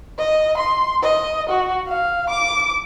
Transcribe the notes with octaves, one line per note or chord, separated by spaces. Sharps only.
D#5
C6
D#5
F#4
F5
D6